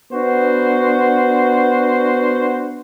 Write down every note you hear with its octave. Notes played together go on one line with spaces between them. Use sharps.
B3 D4 F#4 C5